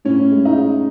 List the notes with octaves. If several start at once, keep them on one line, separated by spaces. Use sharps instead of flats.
A2 C#4
G#3
D#4
G#3